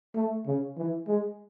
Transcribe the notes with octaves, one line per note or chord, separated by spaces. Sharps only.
A3
C#3
E3
G#3